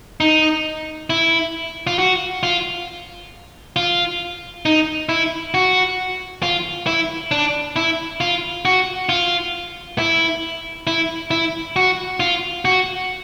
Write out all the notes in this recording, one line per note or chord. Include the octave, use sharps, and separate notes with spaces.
D#4
E4
F4
F#4
F4
F4
D#4
E4
F#4
F4
E4
D4
E4
F4
F#4
F4
E4
E4
E4
F#4
F4
F#4